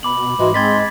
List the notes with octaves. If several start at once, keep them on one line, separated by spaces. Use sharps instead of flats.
B2 B5 D6 F#7
G#2 E3 G#3 F#4
G#3 C4 C6 G#6 A6 B6